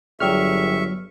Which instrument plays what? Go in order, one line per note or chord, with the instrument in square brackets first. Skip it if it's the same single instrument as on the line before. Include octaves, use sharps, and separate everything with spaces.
[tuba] G1 [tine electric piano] F#3 F6 [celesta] G#4 D5 G5 [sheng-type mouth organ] E5 C#6